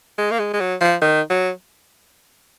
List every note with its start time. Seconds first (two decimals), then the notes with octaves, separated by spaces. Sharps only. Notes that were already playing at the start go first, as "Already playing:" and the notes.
0.18 G#3
0.31 A#3
0.39 G#3
0.54 G#3
0.60 F#3
0.81 F3
1.02 D#3
1.30 F#3